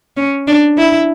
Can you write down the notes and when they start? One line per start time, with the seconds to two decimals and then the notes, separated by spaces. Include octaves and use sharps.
0.17 C#4
0.48 D4
0.78 E4